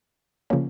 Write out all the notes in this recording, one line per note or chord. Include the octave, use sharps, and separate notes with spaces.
C#3 F3 A#3 C#4